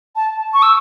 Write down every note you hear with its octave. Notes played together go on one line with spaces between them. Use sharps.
A5
C#6
E6